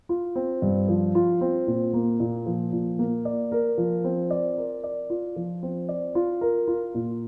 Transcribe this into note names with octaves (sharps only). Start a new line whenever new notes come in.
F4
C4
G2
F3
F4
C4
A#2
A#3
A#2
F3
A#2
A#3
D5
A#4
F3
C4
D5
A#4
D5
F4
F3
C4
D5
F4
A#4
F4
A#2